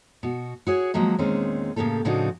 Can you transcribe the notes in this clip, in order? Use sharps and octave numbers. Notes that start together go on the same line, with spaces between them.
B2 F#4
F#4 G#4 C#5
D#3 F3 F#3 G#3 A#3
E2 A#2 D#3 G#3 C4 C#4
A2 C#3 A#3 G4 A4
A2 C#3 F3 D4 D#4 F#4